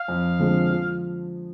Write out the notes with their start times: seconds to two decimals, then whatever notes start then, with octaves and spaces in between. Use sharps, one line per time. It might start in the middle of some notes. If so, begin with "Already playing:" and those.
Already playing: F5
0.08 F2
0.39 D3 F3 G#3 C4
0.70 F3